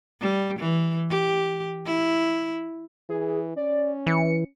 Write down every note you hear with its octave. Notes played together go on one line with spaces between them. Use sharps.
G3
E3
G4
E4
E3 G#4
C#4 D5
E3 C#7